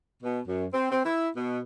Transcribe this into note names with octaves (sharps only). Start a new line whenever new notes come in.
B2
F#2
C4
C4
E4
B2